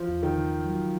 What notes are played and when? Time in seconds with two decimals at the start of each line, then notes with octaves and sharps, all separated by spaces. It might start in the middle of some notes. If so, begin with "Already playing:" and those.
Already playing: E3 F3
0.08 E2
0.23 D#3
0.36 C#3
0.65 F#3